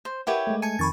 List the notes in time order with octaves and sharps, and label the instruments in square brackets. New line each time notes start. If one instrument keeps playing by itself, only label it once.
[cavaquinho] C5
[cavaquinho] E4 G4 C#5 [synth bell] A#4 B4 F#5
[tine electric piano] G#3 A3
[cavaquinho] G#5 [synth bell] A5 C#7 D#7
[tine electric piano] F2 D#3 [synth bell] B5 C#6 A6